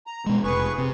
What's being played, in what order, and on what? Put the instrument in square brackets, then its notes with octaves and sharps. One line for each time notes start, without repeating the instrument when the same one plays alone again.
[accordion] A#5
[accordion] F2 [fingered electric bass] B2 G#3
[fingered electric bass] F1 [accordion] G#4 B4 C#6
[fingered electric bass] C3